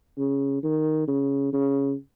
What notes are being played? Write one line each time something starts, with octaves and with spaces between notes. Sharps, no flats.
C#3
D#3
C#3
C#3